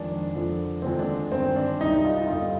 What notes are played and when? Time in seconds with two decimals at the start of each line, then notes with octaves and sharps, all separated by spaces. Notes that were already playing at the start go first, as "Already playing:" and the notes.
Already playing: F2 D#3 G#3 D4
0.34 F2 D3 F3
0.82 D#2 D3 F3 G#3 C4
0.99 D4
1.32 G2 D#3 G#3 C4
1.56 D4
1.81 C2 C3 G3 D#4
2.05 F4
2.22 D#4
2.28 G2 D3 G3 F4